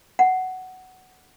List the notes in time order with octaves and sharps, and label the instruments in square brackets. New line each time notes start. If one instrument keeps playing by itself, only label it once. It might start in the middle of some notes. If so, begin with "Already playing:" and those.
[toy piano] F#5